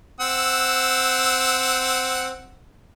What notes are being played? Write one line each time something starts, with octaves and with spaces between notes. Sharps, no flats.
C4 F#5 E6